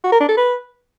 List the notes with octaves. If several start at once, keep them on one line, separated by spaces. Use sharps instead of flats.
F#4
A#4
D4
A4
B4